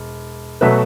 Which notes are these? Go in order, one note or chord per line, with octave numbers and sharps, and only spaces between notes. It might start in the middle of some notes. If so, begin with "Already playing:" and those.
Already playing: E1
B2 F#3 A3 B4 E5